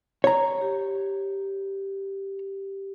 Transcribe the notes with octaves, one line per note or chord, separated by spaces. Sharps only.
C#5 A#5
G4